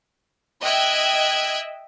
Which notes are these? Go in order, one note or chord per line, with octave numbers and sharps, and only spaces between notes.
D#5 E5 G5 E6 F#6 G#6